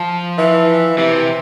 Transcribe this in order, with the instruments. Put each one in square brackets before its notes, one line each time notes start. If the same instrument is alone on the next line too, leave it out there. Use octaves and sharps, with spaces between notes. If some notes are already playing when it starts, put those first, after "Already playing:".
Already playing: [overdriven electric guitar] F3
[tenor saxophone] E3
[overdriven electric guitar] C3 [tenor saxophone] E3